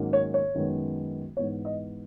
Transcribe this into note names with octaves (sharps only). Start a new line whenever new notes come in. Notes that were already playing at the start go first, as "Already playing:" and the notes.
Already playing: G#2 D#3 F#3 A#3 C#4
C#5
C#5
F#2 D#3 G#3 B3
G#2 E3 B3 C#5
D#5